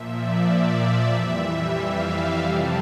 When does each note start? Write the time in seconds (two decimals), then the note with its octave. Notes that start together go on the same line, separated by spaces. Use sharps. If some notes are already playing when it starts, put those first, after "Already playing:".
Already playing: A#2 F3 E5
0.08 D5
0.42 E5
1.07 F2 E3 G3
1.75 F5
2.40 F2 C3 G3 A5